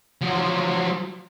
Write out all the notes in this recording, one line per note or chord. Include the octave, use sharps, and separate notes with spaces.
F3 F#3